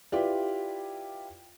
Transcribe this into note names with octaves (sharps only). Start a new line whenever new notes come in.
E4 F4 G4 B4 D5